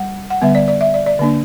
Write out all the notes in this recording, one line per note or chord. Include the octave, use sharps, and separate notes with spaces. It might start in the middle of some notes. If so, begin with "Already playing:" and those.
Already playing: G3 F#5
F#5
D3 G3 B3 E5
D5
D5
E5
D5
D5
D3 A#3 D4